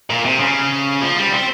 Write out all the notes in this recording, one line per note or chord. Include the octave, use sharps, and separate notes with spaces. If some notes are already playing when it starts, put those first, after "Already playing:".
A#2
C3
C#3
F3
G3
C4